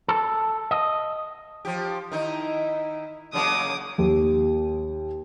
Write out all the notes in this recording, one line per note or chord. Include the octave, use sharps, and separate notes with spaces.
A4
D#5
F3 G4
D#3 D#4 E4
C#3 F#3 A#3 D6 D#6
D#2